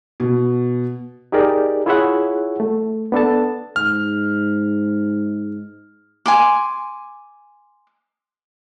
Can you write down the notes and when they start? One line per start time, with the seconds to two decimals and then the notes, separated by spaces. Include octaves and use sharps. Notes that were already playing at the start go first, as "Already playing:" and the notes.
0.20 B2
1.32 D#4 G4 G#4 A#4 D5
1.86 E4 F4 G#4 C#5 E5 F#5
2.60 A3
3.12 B3 D4 A4 A5
3.76 G#2 F6
6.26 G#5 C6 D6